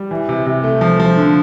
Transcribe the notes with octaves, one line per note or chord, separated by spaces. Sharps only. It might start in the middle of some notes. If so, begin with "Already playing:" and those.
Already playing: G3
E3
C3
C3
A3
F3
F3
D3